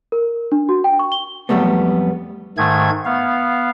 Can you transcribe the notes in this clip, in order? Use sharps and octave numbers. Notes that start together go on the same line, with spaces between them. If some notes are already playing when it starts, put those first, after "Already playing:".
A#4
D4
F#4
G5
C#6
G7
F2 F#3 G3 A3 B3
G#2 D#3 A3 G#6
B3 F5